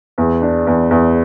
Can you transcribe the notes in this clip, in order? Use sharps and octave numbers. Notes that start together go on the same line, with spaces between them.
E2
D4
E2
E2